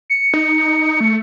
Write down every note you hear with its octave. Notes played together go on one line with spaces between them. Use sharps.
C#7
D#4
A3